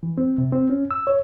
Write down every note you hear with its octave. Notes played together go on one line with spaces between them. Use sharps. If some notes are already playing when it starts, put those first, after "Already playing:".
E3
C4
C3
C4
C#4
E6
C#5